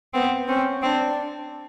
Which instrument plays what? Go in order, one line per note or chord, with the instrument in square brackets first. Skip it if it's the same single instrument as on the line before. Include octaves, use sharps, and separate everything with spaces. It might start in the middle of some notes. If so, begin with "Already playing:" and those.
[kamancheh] B3 [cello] C4
[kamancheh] C4 [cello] C#4
[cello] C4 [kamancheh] D4